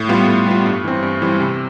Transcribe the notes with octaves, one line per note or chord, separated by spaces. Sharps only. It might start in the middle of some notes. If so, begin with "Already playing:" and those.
Already playing: A2
G3 B3 F4
A2
G3 B3 F4
G2
E3 G3 C4
G2
E3 G3 C4
C3